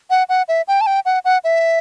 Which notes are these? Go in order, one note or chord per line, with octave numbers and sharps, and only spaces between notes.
F#5
F#5
E5
G5
A5
G5
F#5
F#5
E5